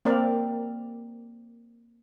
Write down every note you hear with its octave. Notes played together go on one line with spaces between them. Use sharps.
A#3 C4 A#4 D5